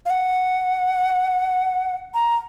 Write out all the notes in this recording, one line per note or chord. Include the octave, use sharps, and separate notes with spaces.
F5
F#5
A#5